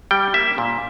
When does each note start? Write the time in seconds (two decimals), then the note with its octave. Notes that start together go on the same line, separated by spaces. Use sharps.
0.11 G3 G5
0.34 A#3 E5
0.58 A#2